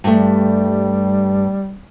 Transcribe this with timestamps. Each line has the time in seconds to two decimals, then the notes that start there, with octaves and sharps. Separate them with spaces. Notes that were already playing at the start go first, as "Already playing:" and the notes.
0.04 G2 G3 A3